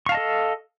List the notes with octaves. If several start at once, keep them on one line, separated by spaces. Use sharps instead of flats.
A4 D#5 F5 A5 C#6